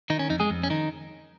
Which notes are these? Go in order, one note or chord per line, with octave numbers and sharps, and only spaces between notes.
D#3 D#4
C#4
F2 D#4
G#3 G#4
F2
C#4
D#3 D#4